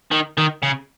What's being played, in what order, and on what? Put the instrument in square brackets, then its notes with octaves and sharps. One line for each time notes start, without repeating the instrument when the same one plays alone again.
[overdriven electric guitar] D#3
D#3
C#3